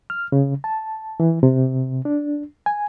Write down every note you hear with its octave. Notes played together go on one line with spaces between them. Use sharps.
F6
C#3
A5
E3
C3
D4
G#5